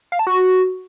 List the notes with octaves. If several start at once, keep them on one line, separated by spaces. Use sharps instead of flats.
F5
A5
F#4